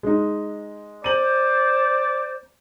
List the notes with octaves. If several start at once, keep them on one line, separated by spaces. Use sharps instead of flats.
G#3 D#4
C5 D5 D#7 F#7